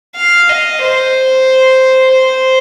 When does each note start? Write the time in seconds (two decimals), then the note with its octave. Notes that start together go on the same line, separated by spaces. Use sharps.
0.16 F5
0.49 D#5
0.82 C5
2.12 C5